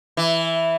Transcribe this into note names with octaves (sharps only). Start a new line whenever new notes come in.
E3